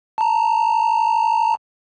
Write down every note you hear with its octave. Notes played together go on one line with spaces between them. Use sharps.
A5 A#5